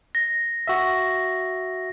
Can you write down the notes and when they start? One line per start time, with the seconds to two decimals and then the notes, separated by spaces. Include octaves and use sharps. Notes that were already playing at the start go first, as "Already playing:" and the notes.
0.15 A#6
0.67 F#4 E5